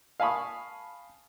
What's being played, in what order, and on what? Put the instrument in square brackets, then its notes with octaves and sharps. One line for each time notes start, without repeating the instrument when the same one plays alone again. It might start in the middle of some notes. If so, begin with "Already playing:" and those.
[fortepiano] F5 G#5 A5 B5 C#6 D#6